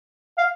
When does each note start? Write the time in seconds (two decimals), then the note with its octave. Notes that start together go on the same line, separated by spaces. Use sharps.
0.38 F5